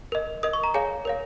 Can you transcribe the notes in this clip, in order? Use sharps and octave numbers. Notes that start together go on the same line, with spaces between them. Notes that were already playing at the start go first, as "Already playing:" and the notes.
A#4 D#5
A#4 D#5 D#6
C#6
A#5
G#4 C#5 F5 G#5
A#4 C#5 F5